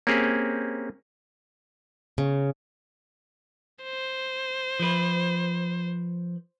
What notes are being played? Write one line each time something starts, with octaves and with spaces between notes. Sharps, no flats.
A#3 C4 C#4 G4 G#4
C#3
C5
F3 B4